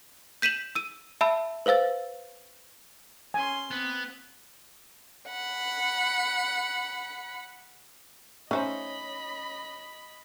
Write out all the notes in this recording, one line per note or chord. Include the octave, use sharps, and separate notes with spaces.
G6 B6 D#7 E7 F#7
E6 D#7
E5 A5 B5 E6
B4 C5 F5 E6 A6
C#4 G#5 C6
B3 C4
F#5 B5
A3 C#4 D#4 C5 D#5 B5